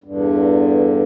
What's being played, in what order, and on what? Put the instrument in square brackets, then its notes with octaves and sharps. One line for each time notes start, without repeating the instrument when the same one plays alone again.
[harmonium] E2 G2 D3